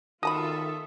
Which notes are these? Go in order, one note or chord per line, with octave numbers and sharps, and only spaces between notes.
D#3 F4 F#4 A4 E5 A5 B5 D#6